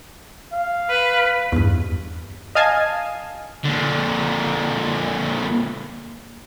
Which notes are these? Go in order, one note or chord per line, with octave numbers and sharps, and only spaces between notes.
F5
B4
E2 G2
D#5 F5 G#5 A5
A#2 D3